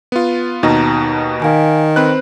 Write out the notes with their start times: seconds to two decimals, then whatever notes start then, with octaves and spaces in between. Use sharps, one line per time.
0.12 B3 F4
0.63 D#2 B2 D#4 D#5 A#5
1.42 D#3 F5 G#5
1.96 C4 B4 C5 F#6